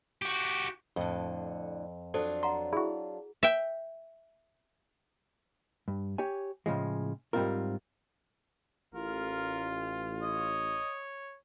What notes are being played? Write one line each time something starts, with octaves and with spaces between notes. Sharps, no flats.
F#4 G4
F2 A2 D3
F#3 D4 F4 A4 C5
F#5 A#5 C6
E4 F#4 G#4
E5 G5
G2
G4 C#5 G#5
A2 C#3 F3 G#3
G#2 G3 B3 C4 F4 A#4
A1 F4 A#4
C#5 D#5